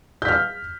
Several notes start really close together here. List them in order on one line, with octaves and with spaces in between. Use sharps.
G6 B6 F6